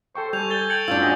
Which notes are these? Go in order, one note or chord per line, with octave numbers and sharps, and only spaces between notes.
A4 C5 G5 C#6
G3 G#5 C#6 G6 F7
A4 A6 G7
G5 C#7 F#7
G2 D4 F4 E6
F#4 G4 D#5 G#5